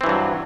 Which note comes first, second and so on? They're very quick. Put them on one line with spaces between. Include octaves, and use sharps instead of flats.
C4 E3 G2 F#3